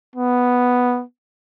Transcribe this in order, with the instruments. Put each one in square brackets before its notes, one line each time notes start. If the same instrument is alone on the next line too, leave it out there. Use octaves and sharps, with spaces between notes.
[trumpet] B3